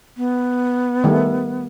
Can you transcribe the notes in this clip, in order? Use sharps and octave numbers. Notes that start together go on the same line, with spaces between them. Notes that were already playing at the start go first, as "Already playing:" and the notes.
B3
D#3 G3 A3